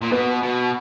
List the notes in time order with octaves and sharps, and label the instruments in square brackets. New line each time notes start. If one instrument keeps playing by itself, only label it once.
[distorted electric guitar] A#2
[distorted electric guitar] B2 [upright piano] B4
[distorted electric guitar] B2